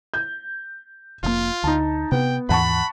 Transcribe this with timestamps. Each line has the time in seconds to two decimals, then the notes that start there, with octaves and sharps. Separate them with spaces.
0.14 G6
1.23 F1 C3 A#3 F4
1.64 D2 D#4 A5
2.12 C3 B3 G5
2.49 D#2 G#2 E3 F#5 A5 B5 C#6